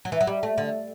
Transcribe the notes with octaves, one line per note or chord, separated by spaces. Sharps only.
F#3
E3
F#3
G3
A3
D3